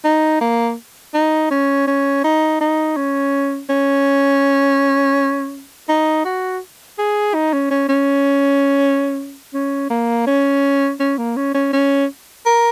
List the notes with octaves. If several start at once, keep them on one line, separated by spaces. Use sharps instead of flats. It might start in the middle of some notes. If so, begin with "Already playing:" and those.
D#4
A#3
D#4
C#4
C#4
D#4
D#4
C#4
C#4
D#4
F#4
G#4
D#4
C#4
C#4
C#4
C#4
A#3
C#4
C#4
A#3
C#4
C#4
C#4
A#4